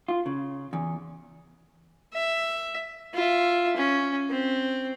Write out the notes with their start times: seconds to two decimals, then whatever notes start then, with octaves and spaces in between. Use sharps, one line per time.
0.08 F4
0.26 C#3
0.73 E2
2.14 E5
3.14 F4 E5
3.77 C#4
4.30 C4